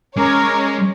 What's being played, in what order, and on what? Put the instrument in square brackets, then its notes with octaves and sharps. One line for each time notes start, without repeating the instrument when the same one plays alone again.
[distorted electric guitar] G#3 [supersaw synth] C#4 [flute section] A#4 D6 [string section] C#5